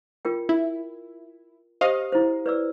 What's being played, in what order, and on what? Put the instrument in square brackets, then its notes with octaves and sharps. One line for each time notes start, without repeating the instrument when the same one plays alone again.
[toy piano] F4 A#4 G5
[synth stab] E4
[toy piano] G4 C5 [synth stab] D#5 F5
[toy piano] E4 C5
B4 D5 E6